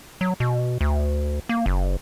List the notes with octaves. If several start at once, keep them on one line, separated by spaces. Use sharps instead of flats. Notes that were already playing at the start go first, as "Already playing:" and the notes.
F#3
B2
D2
A#3
F#1